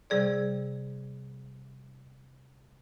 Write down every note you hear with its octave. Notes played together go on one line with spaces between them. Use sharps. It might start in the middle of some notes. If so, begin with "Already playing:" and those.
C3 G3 G#4 D5